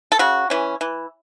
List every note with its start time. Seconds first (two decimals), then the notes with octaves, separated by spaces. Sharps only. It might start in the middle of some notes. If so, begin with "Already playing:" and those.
0.12 A4
0.19 C#3 F#4
0.50 E3 C#4
0.81 E3